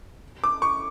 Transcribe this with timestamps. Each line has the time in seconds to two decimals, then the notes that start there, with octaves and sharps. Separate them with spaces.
0.44 D6
0.62 C#6